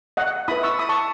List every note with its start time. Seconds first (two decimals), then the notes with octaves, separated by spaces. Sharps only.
0.17 D#5 F#5
0.48 E4 B4 B5 D#6
0.63 C#6 E6
0.79 B5 D#6
0.89 A5 C#6